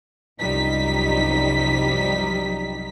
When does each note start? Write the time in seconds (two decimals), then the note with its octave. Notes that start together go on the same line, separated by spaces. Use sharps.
0.41 C2 F#2 F3 G3 D#4 B6